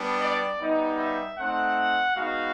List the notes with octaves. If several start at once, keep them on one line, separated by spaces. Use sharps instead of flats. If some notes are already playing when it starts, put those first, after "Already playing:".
Already playing: G3 B3 D4
D5
G3 B3 D#4
E5
A3 C4 D#4 F#5
G#3 B3 D#4 F#4 F5